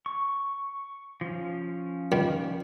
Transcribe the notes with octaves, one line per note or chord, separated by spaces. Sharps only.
C#6
F3 C#4
A#2 D#3 G3